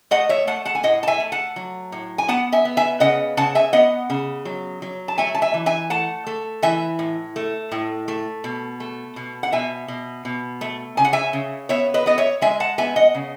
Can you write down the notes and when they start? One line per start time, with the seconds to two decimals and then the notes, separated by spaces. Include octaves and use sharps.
0.11 A3 D#5 F#5
0.29 C#5 E5
0.47 A3 F#5 A5
0.65 F#5 A5
0.75 G#5
0.83 A2 D#5 F#5
1.03 A5
1.07 E5 G#5
1.20 A3
1.32 F#5 A5
1.56 F#3
1.92 A2
2.18 G#5
2.28 B3 F#5 A5
2.52 E5 G#5
2.65 B3
2.77 E5 G#5
3.00 C#3 D#5 F#5
3.37 C#3 F#5 A5
3.55 E5 G#5
3.73 B3 D#5 F#5
4.10 C#3
4.45 F#3
4.82 F#3
5.08 A5
5.18 A3 E5 G#5
5.35 A5
5.42 E5 G#5
5.54 E3
5.66 E5 G#5
5.90 A3 F#5 A5
6.27 A3
6.62 E3 E5 G#5
6.99 A2
7.36 A3
7.72 A2
8.08 A3
8.44 B2
8.80 A3
9.16 B2
9.43 F#5
9.52 B2 E5 G#5
9.88 B2
10.25 B2
10.61 A3
10.97 C#3 G#5
11.05 F#5
11.13 E5 G#5
11.33 C#3
11.69 B3 C#5 E5
11.94 B4 D#5
12.06 B3 D#5
12.18 C#5 E5
12.41 G#3 E5 G#5
12.60 F#5 A5
12.78 B3 E5 G#5
12.96 D#5 F#5
13.15 C#3